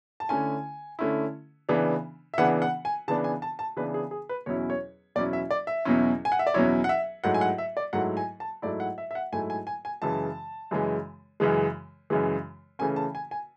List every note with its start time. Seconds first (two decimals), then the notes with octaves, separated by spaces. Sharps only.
0.20 A5
0.29 D3 A3 C#4 E4 G#5
0.99 D3 A3 C#4 E4
1.69 C#3 E3 B3 D4
2.34 E5
2.38 C#3 E3 B3 D4 F#5
2.62 F#5
2.85 G#5
3.08 C#3 E3 B3 D4 A5
3.24 G#5
3.42 A5
3.59 A5
3.77 C#3 E3 B3 D4 B4
3.94 G#4
4.11 G#4
4.29 B4
4.46 E2 B2 F#3 C#4 E4 C#5
4.70 C#5
5.15 E2 B2 F#3 C#4 E4 D5
5.33 E5
5.51 D5
5.67 E5
5.85 E2 B2 F#3 C#4 E4
6.25 G#5
6.32 F#5
6.39 E5
6.47 D5
6.54 E2 B2 F#3 C#4 E4 C#5
6.84 F#5
6.89 E5
7.24 G#2 F#3 A3 E4 F#5
7.34 G#5
7.41 F#5
7.58 E5
7.77 D5
7.93 G#2 F#3 A3 E4 F#5
8.17 G#5
8.40 A5
8.62 G#2 F#3 A3 E4 D5
8.80 F#5
8.98 E5
9.11 E5
9.15 F#5
9.32 G#2 F#3 A3 E4 G#5
9.50 G#5
9.67 G#5
9.85 G#5
10.02 F#2 C#3 E3 G#3 A5
10.71 F#2 C#3 E3 G#3
11.40 F#2 C#3 E3 G#3
12.10 F#2 C#3 E3 G#3
12.79 C#3 E3 A3 C#4 G#5
12.96 A5
13.15 G#5
13.31 G#5